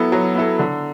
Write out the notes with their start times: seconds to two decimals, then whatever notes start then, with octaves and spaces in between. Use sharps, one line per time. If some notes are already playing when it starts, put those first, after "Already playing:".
Already playing: F#3 B3 E4 A4
0.12 F#3
0.35 B3 E4 A4
0.59 D3